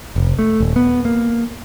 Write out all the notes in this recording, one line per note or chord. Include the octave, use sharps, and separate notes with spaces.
F1
A3
D#1
B3
A#3